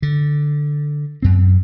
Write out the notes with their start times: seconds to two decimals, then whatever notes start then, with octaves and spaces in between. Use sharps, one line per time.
0.02 D3
1.23 F#2 C4